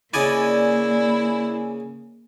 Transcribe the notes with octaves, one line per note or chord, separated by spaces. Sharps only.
C#3 A#3 E4 D5 D#5 G#5